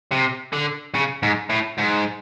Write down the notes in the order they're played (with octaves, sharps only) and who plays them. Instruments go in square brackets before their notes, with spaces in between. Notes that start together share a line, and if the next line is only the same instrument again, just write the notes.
[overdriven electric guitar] C3
D3
C#3
G#2
A2
G#2